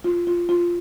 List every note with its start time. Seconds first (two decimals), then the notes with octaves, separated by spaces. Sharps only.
0.04 F4
0.27 F4
0.49 F4